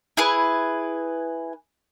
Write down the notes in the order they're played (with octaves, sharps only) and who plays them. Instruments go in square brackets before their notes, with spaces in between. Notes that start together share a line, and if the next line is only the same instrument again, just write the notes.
[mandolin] E4 G#4 B4